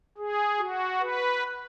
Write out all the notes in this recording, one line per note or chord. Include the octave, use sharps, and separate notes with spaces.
G#4
F#4
B4